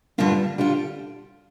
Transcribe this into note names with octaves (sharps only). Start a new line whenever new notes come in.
G2 D3 G3 D4 F4
D3 G3 D4 F4